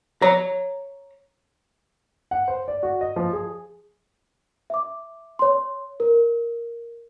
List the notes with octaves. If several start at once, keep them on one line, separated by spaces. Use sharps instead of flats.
C#5 A#5
F#5
C5
D5
F#4
D#5
F3
G#4
E5 D6
C#5 C6
A#4